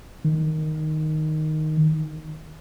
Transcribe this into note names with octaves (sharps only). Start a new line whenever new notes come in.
D#3